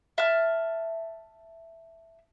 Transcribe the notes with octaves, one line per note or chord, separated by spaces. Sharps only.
E5 A5 F6